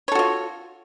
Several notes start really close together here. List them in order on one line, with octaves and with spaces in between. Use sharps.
C#5 A4 F#4 F4